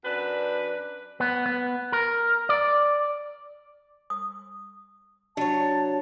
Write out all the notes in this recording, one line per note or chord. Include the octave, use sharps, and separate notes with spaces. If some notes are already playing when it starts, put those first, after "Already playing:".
F#2 D4 B4
B3
B3
A#4
D5
D#6
F#3 D4 C#5 A5